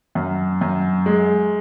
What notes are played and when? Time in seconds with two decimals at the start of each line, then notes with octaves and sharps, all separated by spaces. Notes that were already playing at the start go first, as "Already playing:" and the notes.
0.15 F#2
0.61 F#2
1.06 G#3